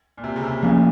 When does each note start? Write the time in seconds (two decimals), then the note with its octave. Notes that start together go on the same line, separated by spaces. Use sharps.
0.17 A#2
0.24 C3
0.36 C#3
0.43 C3
0.62 A#2 F3 A#3 C#4